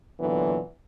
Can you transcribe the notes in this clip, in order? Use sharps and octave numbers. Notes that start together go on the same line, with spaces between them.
A#2 D3 E3 F#3 B3